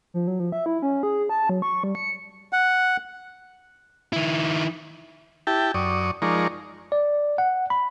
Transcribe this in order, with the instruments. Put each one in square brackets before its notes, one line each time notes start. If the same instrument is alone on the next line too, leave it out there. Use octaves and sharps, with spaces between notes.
[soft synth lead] F3
F#3
F3
E5
E4
C#4
G#4
A5
F#3
C#6
G3
C#7
[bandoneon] F#5
[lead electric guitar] D#3 E4
[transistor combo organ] E4 G4 G5 A5
F#2 D5 C#6 D#6
F3 G#3 D#4 A#4 D5 C#6
[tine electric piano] D5
F#5
B5